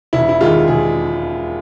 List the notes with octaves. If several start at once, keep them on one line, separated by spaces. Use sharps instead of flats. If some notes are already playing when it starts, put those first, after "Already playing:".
E1 E4
E4
D#2 D#3 G#3 F4
E1 G#4